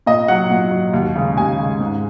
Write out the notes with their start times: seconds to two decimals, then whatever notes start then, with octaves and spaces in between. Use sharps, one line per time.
0.06 A#2 D#5
0.28 F#3 F#5
0.50 A#2
0.72 F#3
0.93 D#2
1.16 C#3 G#3
1.37 D#2 G#5
1.59 C#3 G#3
1.81 G#2